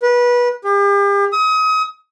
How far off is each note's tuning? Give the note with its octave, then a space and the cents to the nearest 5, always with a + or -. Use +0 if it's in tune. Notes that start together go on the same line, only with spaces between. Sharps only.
B4 -25
G4 +40
D#6 +35